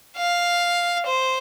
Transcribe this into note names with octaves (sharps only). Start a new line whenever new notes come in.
F5
C5